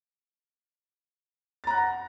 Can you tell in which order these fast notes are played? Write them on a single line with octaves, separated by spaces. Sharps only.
A6 A#5 F#6 F#5 A#6